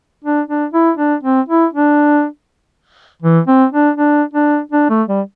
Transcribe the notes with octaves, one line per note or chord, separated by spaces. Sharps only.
D4
D4
E4
D4
C4
E4
D4
E3
C4
D4
D4
D4
D4
A3
G3